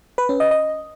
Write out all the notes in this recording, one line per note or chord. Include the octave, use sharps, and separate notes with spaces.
B4
C#4
D#5
D#5